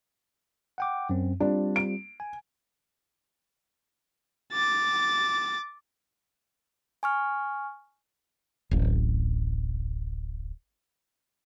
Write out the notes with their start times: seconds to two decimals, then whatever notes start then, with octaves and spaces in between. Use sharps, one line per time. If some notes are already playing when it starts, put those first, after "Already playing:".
0.78 F#5 G5 D6
1.10 F#2 C4
1.40 G3 C4 D4 F4
1.76 D7
2.20 G#5
4.53 D6 A6
7.03 G#5 C#6 F6
8.71 D1 A1